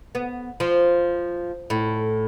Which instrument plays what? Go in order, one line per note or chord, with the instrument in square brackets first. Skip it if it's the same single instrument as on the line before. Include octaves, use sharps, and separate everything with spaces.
[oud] B3
F3
A2